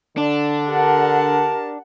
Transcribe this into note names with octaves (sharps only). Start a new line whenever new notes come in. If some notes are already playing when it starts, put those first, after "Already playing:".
D3 D4
G4 A#4 F#5 A5